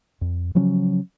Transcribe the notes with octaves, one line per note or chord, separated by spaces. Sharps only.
F2
C#3 F3 F#3 C#4